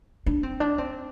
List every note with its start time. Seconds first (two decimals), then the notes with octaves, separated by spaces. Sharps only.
0.26 D4
0.43 C4
0.60 D4
0.78 C4